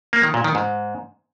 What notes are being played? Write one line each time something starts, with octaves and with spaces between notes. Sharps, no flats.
A#3
D#3
A#2
D#3
G#2